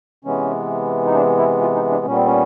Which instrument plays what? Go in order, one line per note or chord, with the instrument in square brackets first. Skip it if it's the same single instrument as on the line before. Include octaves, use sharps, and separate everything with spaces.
[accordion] C3 E3 G#3 B3 C#4
D#4
D4
E4
F4
D#4
D4
A#2 G3 B3 C#4
C4
C#4